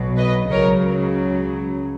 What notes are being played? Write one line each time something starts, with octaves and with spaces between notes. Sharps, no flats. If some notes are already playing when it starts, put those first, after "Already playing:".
Already playing: B1 B2 F#3
B4 D#5
C#2 C#3 F#3 A#4 C#5